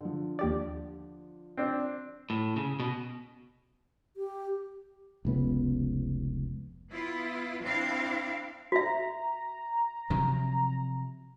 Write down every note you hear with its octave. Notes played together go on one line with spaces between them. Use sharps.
D3 F3
D#2 G4 D5
C4 D4
A2
C#3
B2
G4
F1 C#2 B3
B3 E4 F4
C4 D4 E4 F5
F#4 E5 A#5
C3 F3 F#3